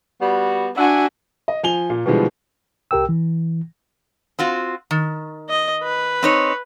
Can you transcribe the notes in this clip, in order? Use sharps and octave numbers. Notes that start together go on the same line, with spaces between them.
G3 B3 F#4
D4 F#4 E5 F#5 G#5
D#5
F3 G#5 F7 G7
A#2
B2 D3 E3 F3 G3 G#3
C2 G4 A#4 G5 E6
E3
C4 F4 F#4
D#3
D#5
B4
C4 D#4 C#5